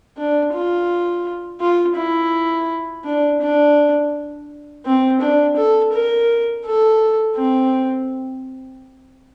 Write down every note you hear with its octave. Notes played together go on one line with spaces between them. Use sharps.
D4
F4
F4
E4
D4
D4
C4
D4
A4
A#4
A4
C4